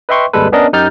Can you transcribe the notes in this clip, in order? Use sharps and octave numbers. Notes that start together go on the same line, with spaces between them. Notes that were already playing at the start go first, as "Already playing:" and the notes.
B4 D#5 E5 G5 C6 C#6
G#1 D#2 G3 G#3 A4 B4
B3 C#4 D4 A#4 D5 D#5
F#2 D#4 G4 F6 G6 A6